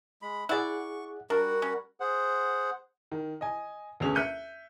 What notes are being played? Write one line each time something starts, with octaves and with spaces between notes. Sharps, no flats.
G#3 B5
E4 G#4 D5 F#5 C#6 F#6
G3 D4 F#4 A#4 F#5
C#4
G#4 C5 F#5
D#3
D#5 G#5
D2 B2 D3 C#4 G#4 F7
E5 F#6 G6 C#7 D#7